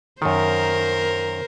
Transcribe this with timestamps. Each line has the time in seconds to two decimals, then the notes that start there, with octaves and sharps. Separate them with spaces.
0.22 F#2 D#3 A#4 C5